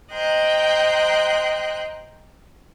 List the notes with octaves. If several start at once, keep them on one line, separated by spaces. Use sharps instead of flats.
C5 D#5 G5 A#5 F#6